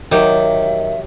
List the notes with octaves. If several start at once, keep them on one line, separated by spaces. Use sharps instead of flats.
D#3 F#3 G4 E5